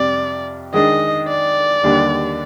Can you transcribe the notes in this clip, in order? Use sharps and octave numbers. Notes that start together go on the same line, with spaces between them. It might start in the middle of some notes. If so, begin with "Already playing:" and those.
Already playing: F2 C3 G3 D5
D#3 G#3 D4 G#4 D#5
D5
D#2 D3 G3 D4